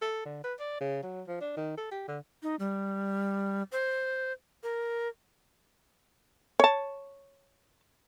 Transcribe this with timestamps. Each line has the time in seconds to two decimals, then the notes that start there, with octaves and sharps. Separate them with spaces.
0.02 A4
0.25 D3
0.44 B4
0.60 D5
0.80 C#3
1.03 F#3
1.27 F3
1.41 D4
1.57 D#3
1.77 A4
1.91 G4
2.08 D3
2.43 D#4
2.59 G3
3.72 C5
4.63 A#4
6.60 C#5 A5